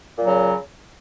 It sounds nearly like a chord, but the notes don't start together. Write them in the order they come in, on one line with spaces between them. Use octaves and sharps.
A#2 F#3 C#3